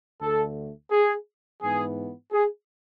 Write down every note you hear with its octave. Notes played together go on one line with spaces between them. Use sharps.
D2 D3 A3 A4
G#4
G#2 E3 B3 G#4
G#4